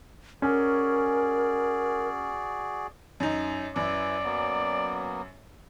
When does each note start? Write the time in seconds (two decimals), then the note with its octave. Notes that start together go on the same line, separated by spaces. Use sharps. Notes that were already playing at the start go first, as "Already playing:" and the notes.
0.42 C#4 F#4 G#4 A#4 D5
3.20 F#2 D#4
3.76 F#2 E4 B4 D5
4.24 F#3 A#3 B3